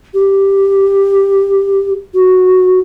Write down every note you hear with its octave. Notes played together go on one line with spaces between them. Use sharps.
G4
F#4